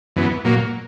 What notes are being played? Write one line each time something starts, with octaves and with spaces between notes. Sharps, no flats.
F#2 E3 B3
A#2 F#3 A#3